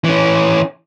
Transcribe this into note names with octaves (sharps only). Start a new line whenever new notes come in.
E3 C#4